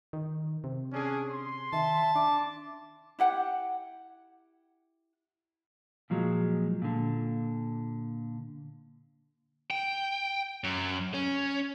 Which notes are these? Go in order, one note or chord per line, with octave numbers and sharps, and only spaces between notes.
D#3
C3
C#4 D4 G#4
C6
D#3 E5 A5
D4 D6
E4 G4 F#5
A#2 F3 F#3 G#3
A#2 D3
G5
F#2
C#4